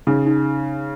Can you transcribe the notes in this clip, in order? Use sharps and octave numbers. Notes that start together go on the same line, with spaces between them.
C#3 D#4
D#4